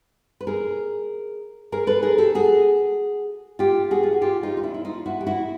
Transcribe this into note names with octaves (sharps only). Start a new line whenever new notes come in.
B4
G#4 A#4
G#4 A#4
A4 B4
G#4 A#4
G4 A4
F#4 G#4
F4 G4
F#4 G#4
F4
F#4
F4 G4
D#4 F4
F4
D4 E4
E4
D#4 F4
E4 F#4
G4
E4 F#4